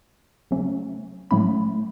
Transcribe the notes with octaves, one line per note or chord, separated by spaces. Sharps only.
C#3 F#3 A3 C#4
A2 F#3 A3 C#4 B5